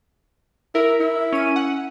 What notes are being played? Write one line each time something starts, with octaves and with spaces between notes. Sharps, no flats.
E4 A#4
E4
C#4 D#7
F#5